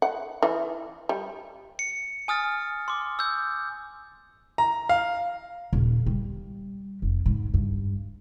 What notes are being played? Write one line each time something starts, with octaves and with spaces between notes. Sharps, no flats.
F#5
E3
G3
C#7
G#5 D#6 F6 A6
C6 D6
E6 G6
A#5
F5
D#1
G3
F1
G#2
G2